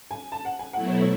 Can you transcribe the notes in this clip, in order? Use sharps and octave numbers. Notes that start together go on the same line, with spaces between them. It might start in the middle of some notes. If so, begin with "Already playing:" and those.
G#5
A5
F#5
G#5
B2 F#3 A3 E4 F#5
C#5
C#5